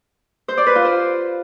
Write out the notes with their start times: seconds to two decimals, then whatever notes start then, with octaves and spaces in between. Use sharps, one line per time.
0.48 C5
0.57 D5
0.66 B4
0.76 F4
0.85 C5